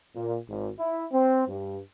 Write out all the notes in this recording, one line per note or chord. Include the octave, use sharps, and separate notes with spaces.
A#2
G#1
E4
C4
G2